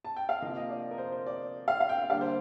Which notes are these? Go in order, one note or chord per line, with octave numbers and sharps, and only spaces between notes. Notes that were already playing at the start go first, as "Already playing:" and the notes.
A5
G5
F5
C3 F3 A#3 D#5
D#5
D5
A#4
C5
C5
D5
F5
F5
G5
D3 G3 A#3 F5
C5